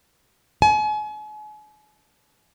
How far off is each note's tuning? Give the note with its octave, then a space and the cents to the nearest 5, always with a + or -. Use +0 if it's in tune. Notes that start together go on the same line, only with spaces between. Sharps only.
G#5 +40